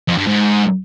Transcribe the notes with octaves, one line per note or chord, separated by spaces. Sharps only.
F2
G2
G#2